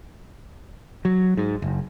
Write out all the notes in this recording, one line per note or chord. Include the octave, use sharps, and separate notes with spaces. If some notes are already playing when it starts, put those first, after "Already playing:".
F#3
G#2
F#1